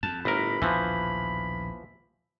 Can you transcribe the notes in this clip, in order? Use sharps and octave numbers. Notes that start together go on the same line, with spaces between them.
F2 A5
G1 A2 A#4 B5
A#1 D#2 B2 E3 F3